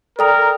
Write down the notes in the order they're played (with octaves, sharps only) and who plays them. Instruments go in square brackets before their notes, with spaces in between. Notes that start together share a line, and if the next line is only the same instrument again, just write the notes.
[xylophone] A4 D5 G5 A#5 D#6 [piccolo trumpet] A#4